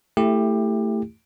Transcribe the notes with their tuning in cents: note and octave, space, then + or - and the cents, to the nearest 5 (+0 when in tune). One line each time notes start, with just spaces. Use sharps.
A3 +15 E4 +0 G4 +20